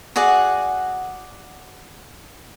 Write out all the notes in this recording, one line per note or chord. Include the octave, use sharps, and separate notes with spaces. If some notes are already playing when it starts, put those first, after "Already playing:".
F#4 G#4 D5 F#5